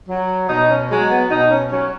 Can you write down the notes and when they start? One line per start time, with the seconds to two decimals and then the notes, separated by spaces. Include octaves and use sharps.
0.09 F#3
0.49 B2 D#4
0.70 C#4
0.90 F#3 G#3
1.10 B3
1.30 B2 D#4
1.50 C#4
1.71 F#3 C#4